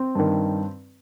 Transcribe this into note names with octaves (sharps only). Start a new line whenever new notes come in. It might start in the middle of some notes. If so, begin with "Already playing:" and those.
Already playing: C4
G2 D#3